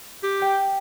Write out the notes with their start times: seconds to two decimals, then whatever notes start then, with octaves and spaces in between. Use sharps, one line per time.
0.24 G4
0.40 G5 G6